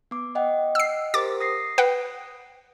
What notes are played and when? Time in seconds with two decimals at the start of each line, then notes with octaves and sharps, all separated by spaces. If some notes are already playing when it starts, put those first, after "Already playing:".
0.11 B3 D6
0.35 D#5 F#5 G5
0.75 E6 C7
1.14 G4 A#4 C5 D6 A6
1.41 D#6 A#6 C7
1.78 B4 F#5 G5